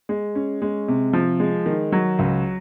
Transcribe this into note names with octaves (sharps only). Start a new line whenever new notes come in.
G#3
C#4
G#3
C3
F3
G#3
D#3
F#3
C#2